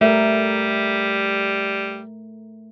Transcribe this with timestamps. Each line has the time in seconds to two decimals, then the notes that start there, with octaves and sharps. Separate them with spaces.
0.01 G3 A3 A#4 E5